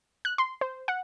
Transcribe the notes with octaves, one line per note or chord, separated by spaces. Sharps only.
F#6
C6
C5
F#5